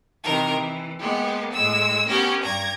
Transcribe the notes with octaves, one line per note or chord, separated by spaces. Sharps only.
C3 D#3 E3 A#4
E3
G#3 A#3 B3 G4
A2 G#3 E6
B3 C#4 G4 A#4
G2 A#5 G#6